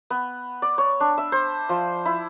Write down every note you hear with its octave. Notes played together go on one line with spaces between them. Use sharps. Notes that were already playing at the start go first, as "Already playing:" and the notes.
B3
D5
C#5
D4
E5
C5
F3
E4